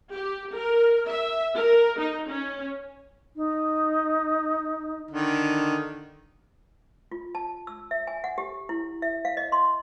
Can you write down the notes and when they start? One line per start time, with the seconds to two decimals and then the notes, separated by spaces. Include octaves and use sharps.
0.14 G4
0.56 A#4
1.09 E5
1.56 A#4
1.99 D#4
2.29 C#4
3.36 D#4
5.11 D3 D#3
7.12 F4
7.35 A5
7.67 E6
7.91 E5
8.07 G#5
8.24 F#5
8.38 G4
8.69 E4
9.02 E5
9.25 F5
9.37 D#5
9.52 C6